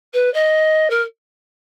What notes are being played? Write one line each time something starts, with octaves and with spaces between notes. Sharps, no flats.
B4
D#5
A#4